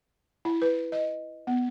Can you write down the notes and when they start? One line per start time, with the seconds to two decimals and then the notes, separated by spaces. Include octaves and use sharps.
0.45 E4
0.62 B4
0.92 D#5
1.47 B3